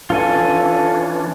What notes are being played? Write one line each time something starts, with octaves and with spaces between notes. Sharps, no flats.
E3 C#4 D4 F4 A4 G#5